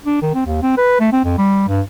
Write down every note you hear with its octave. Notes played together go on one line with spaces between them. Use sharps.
D4
D#3
C4
D#2
C4
B4
A3
C4
F2
G3
G2